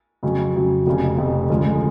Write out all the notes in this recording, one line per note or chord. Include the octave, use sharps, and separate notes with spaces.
F2 C#3 F#3
F2 C#3 F#3
F1 F2 C#3
F1 F2 C#3
D2 C#3 F3 G#3